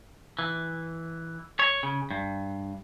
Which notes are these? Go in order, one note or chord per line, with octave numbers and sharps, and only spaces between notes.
E3
C#5
C#3
G2